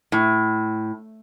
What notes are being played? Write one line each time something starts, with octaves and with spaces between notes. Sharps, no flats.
A2